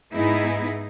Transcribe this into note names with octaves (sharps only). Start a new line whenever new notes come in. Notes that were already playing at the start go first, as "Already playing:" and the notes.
G#2 B3 D#4 E4 G#4